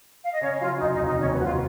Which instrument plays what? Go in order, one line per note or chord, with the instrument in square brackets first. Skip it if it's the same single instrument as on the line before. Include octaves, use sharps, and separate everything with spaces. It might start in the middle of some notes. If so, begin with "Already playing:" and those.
[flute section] F5
D#5
[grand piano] C#3 [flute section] C#4 C#5
[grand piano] F#3 [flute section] F4 F5
[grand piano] F1 [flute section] D#4 D#5
[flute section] D#4 D#5
[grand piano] F1
[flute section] D#4 D#5
[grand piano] D#2 [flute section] C#4 C#5
[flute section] B4
[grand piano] F1 [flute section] F#4
[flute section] F4